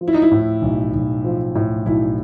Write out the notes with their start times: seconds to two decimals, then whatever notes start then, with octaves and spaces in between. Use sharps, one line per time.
0.01 F3
0.08 E4
0.14 D#4
0.22 E4
0.32 A2
0.62 B1
0.94 B1
1.24 F3
1.55 A2
1.86 B1 E4